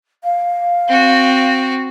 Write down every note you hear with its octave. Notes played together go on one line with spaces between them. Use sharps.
F5
C4 F#4